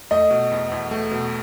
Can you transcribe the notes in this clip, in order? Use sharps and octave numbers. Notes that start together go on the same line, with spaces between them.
A3 D#5
B2
E2
E2
A3
B2